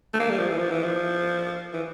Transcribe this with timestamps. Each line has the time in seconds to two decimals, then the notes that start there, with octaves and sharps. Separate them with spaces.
0.13 A3
0.19 A#3
0.30 G3
0.38 F3
0.49 E3
0.58 F3
0.71 E3
0.83 F3
1.73 E3